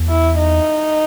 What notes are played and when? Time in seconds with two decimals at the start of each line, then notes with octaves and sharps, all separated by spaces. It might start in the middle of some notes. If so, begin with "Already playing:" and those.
Already playing: E2
0.09 E4
0.38 D#4